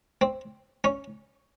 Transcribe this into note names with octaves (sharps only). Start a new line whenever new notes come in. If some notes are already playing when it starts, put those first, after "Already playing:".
C4
C#4